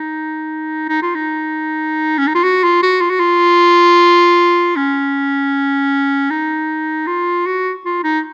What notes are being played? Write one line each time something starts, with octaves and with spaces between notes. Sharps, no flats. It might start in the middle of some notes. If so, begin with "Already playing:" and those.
Already playing: D#4
D#4
F4
D#4
C#4
D#4
F4
F#4
F4
F#4
F4
F#4
F4
C#4
D#4
F4
F#4
F4
D#4